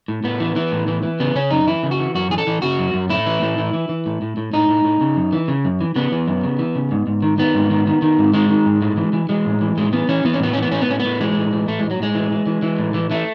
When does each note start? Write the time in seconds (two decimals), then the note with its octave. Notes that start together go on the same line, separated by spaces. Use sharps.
0.08 A2
0.24 A2 B3
0.40 E3
0.56 E3
0.72 A2
0.88 E3
1.03 E3
1.20 C#3 B3
1.35 C#3 C#4
1.51 F#2 D#4
1.67 E3 E4
1.83 C#3
1.91 F#4
1.99 E3
2.15 F#2 F#4
2.30 E3 G#4
2.38 A4
2.47 E3
2.62 C#3 F#4
2.79 F#2
2.94 F#2
3.10 A2 E4
3.26 E3
3.42 A2
3.58 E3
3.74 E3
3.89 E3
4.06 A2
4.22 A2
4.37 A2
4.53 A2 D#4
4.68 A2
4.85 A2
5.01 C#3
5.17 F#2
5.33 E3
5.48 C#3
5.65 F#2
5.81 E3
5.96 C#3 B3
6.12 E3
6.28 F#2
6.44 C#3
6.59 E3
6.75 C#3
6.91 G#2
7.07 G#2
7.22 D#3
7.38 D#3 B3
7.55 G#2
7.70 D#3
7.87 D#3
8.02 D#3
8.19 G#2
8.34 D#3 G#3
8.49 D#3
8.66 G#2
8.82 A2
8.97 E3
9.13 E3
9.29 E3 G#3
9.46 A2
9.61 E3
9.77 A2 G#3
9.93 E3 B3
10.09 E3 C#4
10.24 E3 B3
10.33 C#4
10.40 A2 B3
10.53 E3 C#4
10.63 B3
10.72 A2 C#4
10.81 B3
10.88 A2 C#4
11.00 B3
11.05 A2
11.21 E3 G#3
11.36 A2
11.52 E3
11.68 A2 A3
11.79 A2 G#3
11.91 F#3
12.00 A2 G#3
12.15 E3
12.32 E3
12.46 E3
12.62 E3
12.79 A2
12.94 E3
13.11 E3 A3